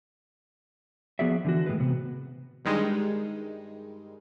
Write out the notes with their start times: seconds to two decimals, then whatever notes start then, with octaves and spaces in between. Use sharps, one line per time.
1.19 F3 B3 F#4 G#4 D5 E5
1.44 D3 E3 F#4
1.66 A2 D#3 G#3 B4
1.80 C3 B3
2.65 G2 D#3 G3 G#3 D#4